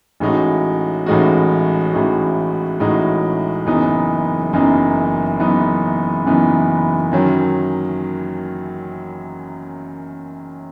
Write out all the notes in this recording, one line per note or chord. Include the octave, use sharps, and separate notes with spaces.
A1 A2 G#3 D#4 F#4
A1 A2 G#3 D#4 F#4
A1 A2 G#3 D#4 F#4
A1 A2 G#3 D#4 F#4
F#1 F#2 E3 B3 D#4
F#1 F#2 E3 B3 D#4
F#1 F#2 E3 B3 D#4
F#1 F#2 E3 B3 D#4
F#2 D#3 F#3 C#4